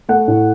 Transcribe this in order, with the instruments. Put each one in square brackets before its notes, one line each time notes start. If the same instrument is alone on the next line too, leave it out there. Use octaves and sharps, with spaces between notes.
[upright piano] A3 F#5
A2